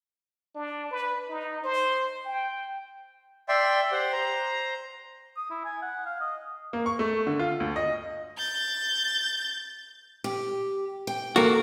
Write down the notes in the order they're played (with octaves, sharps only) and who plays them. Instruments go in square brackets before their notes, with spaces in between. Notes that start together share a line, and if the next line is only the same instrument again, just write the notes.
[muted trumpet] D4
B4
D#4
C5
G5
[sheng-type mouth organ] D5 E5 G5 C6
G4 C5 F#5
C5 A#5
[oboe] D#6
E4
G#5
F#5
F5
D#5
[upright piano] A#3
C#6
A3
D3
F4
D2
D#5
[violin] G6 A6
[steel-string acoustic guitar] G4
G5
[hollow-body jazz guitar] A#3 F#4 [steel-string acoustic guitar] A4